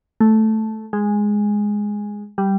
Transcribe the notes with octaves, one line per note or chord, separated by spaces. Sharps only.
A3
G#3
G3